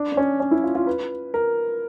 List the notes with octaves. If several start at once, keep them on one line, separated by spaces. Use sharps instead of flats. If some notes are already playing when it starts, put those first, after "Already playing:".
Already playing: D4
D4
C#4
C#4
E4
F4
F4
B4
A#4